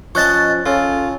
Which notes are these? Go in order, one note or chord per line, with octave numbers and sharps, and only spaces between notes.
F3 C#4 C5 D#5 A5 C#6 F#6 A6
C#3 F4 A4